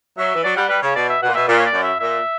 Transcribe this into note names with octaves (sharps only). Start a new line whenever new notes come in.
F#3 E5
E3
F#3 D5
G3 F#5
G3 B4
C#3 C#5
B2 D5
E5
B2 F#5
A#2
B2 E5
A#2 D5
C#5
D5
F#2
E5
A#2 E5